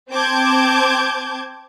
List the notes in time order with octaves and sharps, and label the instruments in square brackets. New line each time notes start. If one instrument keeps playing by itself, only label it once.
[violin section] C4 A5 D6 G6 G#6